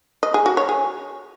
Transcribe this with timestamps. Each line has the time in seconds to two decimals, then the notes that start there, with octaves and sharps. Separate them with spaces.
0.23 D#5
0.34 G#4
0.46 F#4
0.57 C#5
0.69 G#4